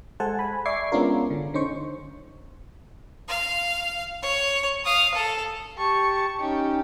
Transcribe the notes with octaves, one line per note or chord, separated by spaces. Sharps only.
G#3 A4 C5 F#5 G#5 A5
G#5 B5
D5 E5 C#6 D6 G#6 C7
G#3 B3 C#4 D4 F4 A#4
D3
D3 C#4 D#4 C5 C#6
F5
C#5
F5 D#6
A4
G4 A5 C#6
C#4 D#4 G4